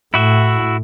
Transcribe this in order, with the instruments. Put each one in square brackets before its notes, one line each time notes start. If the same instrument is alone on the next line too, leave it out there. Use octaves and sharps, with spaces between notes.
[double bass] A2 [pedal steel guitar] E4 F#4 E5